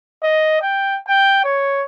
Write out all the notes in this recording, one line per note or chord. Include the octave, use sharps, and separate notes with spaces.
D#5
G5
G5
C#5